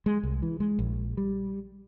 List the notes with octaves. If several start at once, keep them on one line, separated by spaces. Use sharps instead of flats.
G#3
C2
E3
G#3
A#1
G3